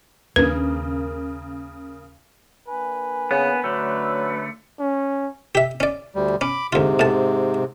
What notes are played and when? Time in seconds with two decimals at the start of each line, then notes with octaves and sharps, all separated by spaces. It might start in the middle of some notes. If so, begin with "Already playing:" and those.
0.36 D#2 C#3 A#3 D4 B4
2.68 A#3 D4 B4 G#5
3.31 C#3 B3
3.64 D3 F#3 A3 C#4 D4 C#5
4.79 C#4
5.55 G4 E5
5.80 C#4 D5
6.15 D2 G3
6.41 C#4 B5 D6
6.73 D2 G#2 C3 F4
6.99 A2 A5